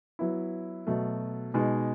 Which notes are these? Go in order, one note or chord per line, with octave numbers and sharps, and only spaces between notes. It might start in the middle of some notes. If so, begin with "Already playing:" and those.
F#3 B3 E4
B2 F#3 A3
B2 G#3 D#4